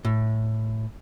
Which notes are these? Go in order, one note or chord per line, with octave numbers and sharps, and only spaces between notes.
A2